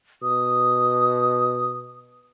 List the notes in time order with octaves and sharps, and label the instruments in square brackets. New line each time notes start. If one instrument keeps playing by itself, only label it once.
[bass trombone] B2 [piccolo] D#6